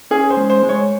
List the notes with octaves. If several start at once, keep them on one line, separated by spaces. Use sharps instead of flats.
C#4 G#4
C5
G#3
C5
G#3
C#5